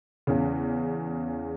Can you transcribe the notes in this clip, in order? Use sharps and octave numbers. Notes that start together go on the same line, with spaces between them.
E2 C#3